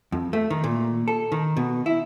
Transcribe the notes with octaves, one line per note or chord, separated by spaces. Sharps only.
F2
A3
D#3
A#2
A4
D#3
B2
E4